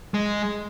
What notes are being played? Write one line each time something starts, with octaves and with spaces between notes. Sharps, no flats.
G#3